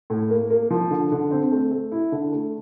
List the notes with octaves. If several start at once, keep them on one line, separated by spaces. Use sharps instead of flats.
A2
A#3
A#3
F3
D3
D3
C4
A3
A3
E4
D3
A3